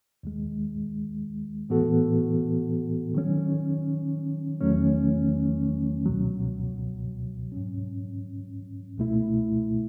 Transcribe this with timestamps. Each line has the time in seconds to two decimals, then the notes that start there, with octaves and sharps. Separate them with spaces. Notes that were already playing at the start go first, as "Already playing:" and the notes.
0.23 D#2 D#3 G#3
1.69 A2 E3 B3 F#4 A4
3.14 D#3 F#3 C#4
4.61 E2 D#3 F#3 A3 C#4
6.06 C#2 B2 F#3
7.52 G#2 F#3 C#4
8.98 C#2 B2 A3 E4